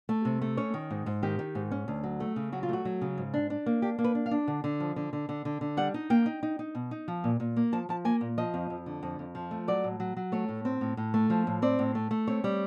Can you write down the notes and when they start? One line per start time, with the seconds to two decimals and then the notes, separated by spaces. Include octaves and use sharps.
0.09 A3
0.25 C3
0.41 A3
0.57 C#4 C#5
0.74 D#3
0.90 G#2
1.06 G#2
1.22 D#3 G4
1.39 D#3
1.55 G#2
1.71 C#4
1.88 D2
2.03 F#3
2.20 A3
2.36 C#3
2.52 F#3 F#4
2.63 F4
2.69 A3 F#4
2.85 F#3
3.01 C#3
3.18 G#2
3.34 D4
3.50 D4
3.66 A#3
3.82 D4 G4
3.99 A#3
4.04 B4
4.15 D4
4.26 F5
4.31 D4
4.47 D3
4.64 D3
4.80 F3
4.96 D3
5.13 D3
5.29 D3
5.45 D3
5.61 D3
5.77 G3 F#5
5.94 D#4
6.10 A#3 G5
6.26 D#4
6.43 D#4
6.59 D#4
6.75 B2
6.91 D#4
7.08 F3
7.24 A#2
7.40 A#2
7.56 A#3
7.72 F3 A5
7.89 F3 A5
8.05 A#3 G#5
8.21 A#2
8.38 F3 D#5
8.54 F2
8.70 F2
8.86 D3
9.03 F2
9.19 F2
9.35 F3
9.51 A3
9.68 F#3 D5
9.84 A2
10.00 F#3
10.17 F#3
10.32 A3 C#5
10.49 A2
10.65 C4
10.81 A2
10.97 A2
11.14 A3
11.30 F3
11.47 A2
11.62 C4 D5
11.79 A2
11.95 A3
12.11 A3
12.27 C4 C#5
12.44 G3